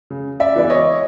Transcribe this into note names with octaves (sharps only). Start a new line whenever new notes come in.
C#3
D5 E5
E3 G#3 B3 D5
C#5 D#5